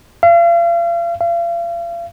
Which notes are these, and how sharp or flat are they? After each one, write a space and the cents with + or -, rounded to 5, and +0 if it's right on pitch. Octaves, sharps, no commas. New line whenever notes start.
F5 -40
F5 -40